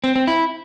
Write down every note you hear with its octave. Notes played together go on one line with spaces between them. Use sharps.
C4
C4
E4